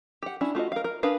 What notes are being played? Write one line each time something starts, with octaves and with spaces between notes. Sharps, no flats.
G4 F#5
C#4 D4 E4
A3 F4 F#4 D#5
A#4 F5
A#4
D4 G#4 A#4 B4 F5